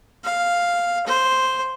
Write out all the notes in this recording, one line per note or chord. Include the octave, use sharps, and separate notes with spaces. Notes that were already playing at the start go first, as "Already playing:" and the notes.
F5
C5